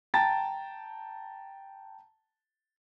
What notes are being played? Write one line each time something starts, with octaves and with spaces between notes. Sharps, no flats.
G5 A5 A#5 A6